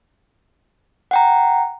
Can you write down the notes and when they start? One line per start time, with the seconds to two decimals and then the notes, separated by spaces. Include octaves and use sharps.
1.11 F#5 G5 A#5